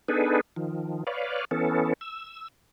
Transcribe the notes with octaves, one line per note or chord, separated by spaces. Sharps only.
B3 D4 D#4 G#4 A4 B4
D#3 F3
B4 C#5 D5 F5
E3 B3 C#4 A4
E6